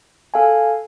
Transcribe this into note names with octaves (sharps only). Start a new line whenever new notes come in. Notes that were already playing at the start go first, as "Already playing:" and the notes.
A4 F5 G#5